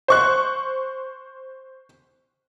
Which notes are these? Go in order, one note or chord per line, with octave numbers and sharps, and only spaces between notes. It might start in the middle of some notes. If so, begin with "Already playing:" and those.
C5 C#6 F#6